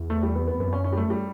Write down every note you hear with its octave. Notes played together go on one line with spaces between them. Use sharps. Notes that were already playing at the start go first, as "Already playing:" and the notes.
Already playing: E2
A3
G3
B3
B3
F#2 B3
C#4
C#4
G3
A3
G3